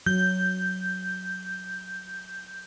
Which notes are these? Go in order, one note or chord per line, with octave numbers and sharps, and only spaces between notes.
F#3 G6